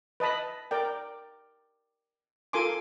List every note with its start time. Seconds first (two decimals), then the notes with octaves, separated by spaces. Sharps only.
0.20 B4 D#5 A5 B5
0.71 A#4 D5 G5
2.53 F4 A4 A#4 G#5 C6 D6